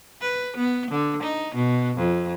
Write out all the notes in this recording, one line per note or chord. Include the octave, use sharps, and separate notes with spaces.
B4
B3
D3
D#4
B2
F2